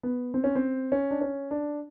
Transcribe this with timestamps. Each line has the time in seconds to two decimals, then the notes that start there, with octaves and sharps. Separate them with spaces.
0.03 B3
0.34 C4
0.44 C#4
0.55 C4
0.92 C#4
1.11 D4
1.21 C#4
1.51 D4